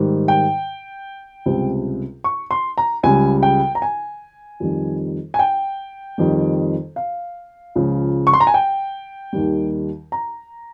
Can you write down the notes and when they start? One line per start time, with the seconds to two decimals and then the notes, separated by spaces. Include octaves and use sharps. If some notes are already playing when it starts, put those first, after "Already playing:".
Already playing: G#2 D#3 G3
0.28 G5
1.46 C#2 C3 G3
2.24 C#6
2.51 C6
2.78 A#5
3.03 C#2 C#3 G3 G#5
3.43 G5
3.75 A#5
3.82 G#5
4.60 F2 D#3 G3
5.34 G#5
5.39 G5
6.18 F2 D#3 G3
6.96 F5
7.75 C#2 C#3 F3
8.27 C#6
8.33 C6
8.40 A#5
8.47 G#5
8.54 G5
9.33 D#2 D#3 G3
10.12 A#5